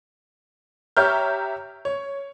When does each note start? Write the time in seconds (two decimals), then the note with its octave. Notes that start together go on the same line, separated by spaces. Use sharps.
0.97 G4 C#5 E5 A#5 F6 G6
1.85 C#5